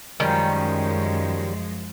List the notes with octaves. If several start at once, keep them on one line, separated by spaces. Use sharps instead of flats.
F#2 D#3 F3 G3 G#3 C#4